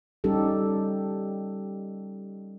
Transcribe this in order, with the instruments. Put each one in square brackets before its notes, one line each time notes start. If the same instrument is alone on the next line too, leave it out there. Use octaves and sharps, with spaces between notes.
[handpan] G3 C#4 D#4 G4 A4